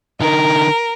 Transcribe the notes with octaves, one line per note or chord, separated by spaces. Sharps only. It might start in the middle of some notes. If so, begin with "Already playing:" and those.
D3 D#4 A#4